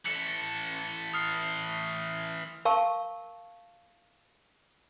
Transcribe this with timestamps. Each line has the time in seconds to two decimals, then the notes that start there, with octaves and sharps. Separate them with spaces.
0.06 E3 A4 C#7
1.14 D#6 F6 C7
2.65 A#4 F5 A5 C#6